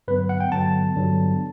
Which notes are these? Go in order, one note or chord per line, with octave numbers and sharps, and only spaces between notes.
G2 D3 F#3 B3 B4
F#5
G5
G2 D3 F#3 B3 A5
G2 D3 F#3 B3